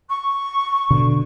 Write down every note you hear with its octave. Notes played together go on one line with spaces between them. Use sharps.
C#6
B2 D3